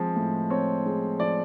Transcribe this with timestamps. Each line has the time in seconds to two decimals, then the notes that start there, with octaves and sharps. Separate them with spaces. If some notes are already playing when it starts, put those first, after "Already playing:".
Already playing: F3 G#3 C4
0.16 A2
0.50 C4 C#5
0.86 G#3
1.20 F3 D5